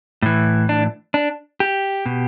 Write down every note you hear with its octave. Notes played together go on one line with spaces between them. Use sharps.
A2 E3
D4
D4
G4
B2